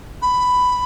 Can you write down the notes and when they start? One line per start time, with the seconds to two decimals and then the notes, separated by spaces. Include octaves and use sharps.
0.22 B5